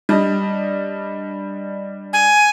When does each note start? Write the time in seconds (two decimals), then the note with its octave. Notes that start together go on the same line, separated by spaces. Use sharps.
0.09 G3 D4 D#5
2.13 G#5